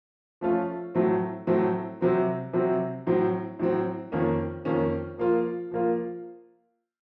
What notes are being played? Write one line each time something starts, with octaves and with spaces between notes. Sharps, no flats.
F3 A3 C#4 F4
A2 F#3 A3 C4
A2 F#3 A3 C4
C3 F#3 C4
C3 F#3 C4
A2 F#3 C4
A2 F#3 C4
F2 D#3 A#3 C#4
F2 D#3 A#3 C#4
F3 A#3 F4
F3 A#3 F4